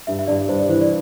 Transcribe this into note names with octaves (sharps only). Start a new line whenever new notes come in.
G2 E5
E5
G2 D5
G2 C5
D5
E3 C5
D5